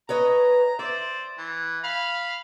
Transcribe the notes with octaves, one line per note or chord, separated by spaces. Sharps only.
B4 C#5 D#5 A#5
C5 D5 E5
E3
F5 B5